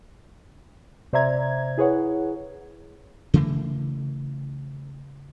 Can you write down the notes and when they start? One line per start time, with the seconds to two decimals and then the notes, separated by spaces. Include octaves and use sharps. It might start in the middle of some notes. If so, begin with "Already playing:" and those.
1.13 C3 C5 D5 E5 A#5 G#6
1.78 E4 G#4 B4 C#5 F#5
3.34 C#3 E3 A3 A#3